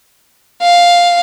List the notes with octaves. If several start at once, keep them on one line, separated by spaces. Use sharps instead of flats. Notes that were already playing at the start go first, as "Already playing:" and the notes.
F5